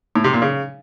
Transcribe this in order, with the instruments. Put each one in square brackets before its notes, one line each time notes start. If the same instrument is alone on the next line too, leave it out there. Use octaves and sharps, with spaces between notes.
[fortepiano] A2
C3
A#2
C#3